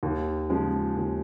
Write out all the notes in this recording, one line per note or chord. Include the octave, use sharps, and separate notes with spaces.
D#2
C#3 F3 G#3
D#2